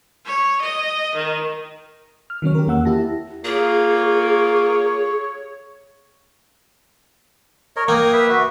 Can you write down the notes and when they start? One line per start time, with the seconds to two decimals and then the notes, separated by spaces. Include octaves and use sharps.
0.25 C#5
0.60 D#5
1.15 D#3
2.30 F6
2.42 D#3 F#3 C#4 C#5
2.55 G4 A#4
2.67 E2 A#3 F#5 E6
2.85 E4 G4 A5 A#6
3.45 A#3 F4 G#4 C#5
7.76 A#4 C#5 D#5
7.88 A#3 G5 D#6
8.13 B4 E5
8.29 F#4